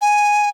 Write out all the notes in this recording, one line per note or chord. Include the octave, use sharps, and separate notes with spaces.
G#5